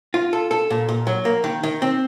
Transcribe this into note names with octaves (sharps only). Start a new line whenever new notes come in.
F4
A4
A4
A#2
A#2
F#3
A#3
D#3
D#3
C4